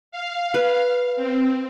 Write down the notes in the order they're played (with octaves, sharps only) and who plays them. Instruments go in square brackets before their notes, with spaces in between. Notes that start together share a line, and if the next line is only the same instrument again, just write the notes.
[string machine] F5
[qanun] B4
[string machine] C4